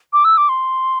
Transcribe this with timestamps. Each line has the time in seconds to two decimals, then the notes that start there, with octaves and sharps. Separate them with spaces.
0.13 D6
0.25 E6
0.37 D6
0.49 C6